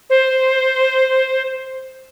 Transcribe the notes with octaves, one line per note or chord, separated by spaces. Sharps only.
C5